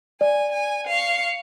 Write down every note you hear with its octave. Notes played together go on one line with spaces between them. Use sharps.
D5 G#5
G#5
F5 C#6